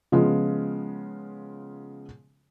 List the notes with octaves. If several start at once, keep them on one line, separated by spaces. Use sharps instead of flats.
C#3 F3 G#3 B3 F4